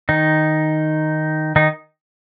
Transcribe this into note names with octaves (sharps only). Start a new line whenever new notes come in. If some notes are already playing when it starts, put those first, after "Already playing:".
D#3 D#4
D#3 D#4